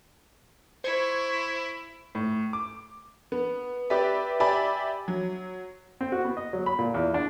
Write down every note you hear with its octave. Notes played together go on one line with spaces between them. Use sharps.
E4 C5 C#6 G#6
A2
D6
B3
G4 B4 D5 E5
G4 D5 E5 G#5 B5
F#3
C4
F#4
B3
D#5
F#3
B5
A#2
E2
D4